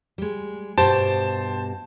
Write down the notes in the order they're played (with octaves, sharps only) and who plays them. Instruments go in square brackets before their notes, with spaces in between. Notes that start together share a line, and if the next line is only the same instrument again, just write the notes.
[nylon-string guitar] G3 G#3
[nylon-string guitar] G2 B2 G4 [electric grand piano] C5 A5